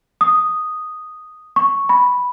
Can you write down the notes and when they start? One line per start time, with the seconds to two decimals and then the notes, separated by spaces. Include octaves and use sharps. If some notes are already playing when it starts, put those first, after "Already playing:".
0.21 D#6
1.56 C#6
1.89 B5